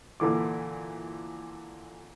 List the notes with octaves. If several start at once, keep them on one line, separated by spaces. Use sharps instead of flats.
A#2 D3 E3 D6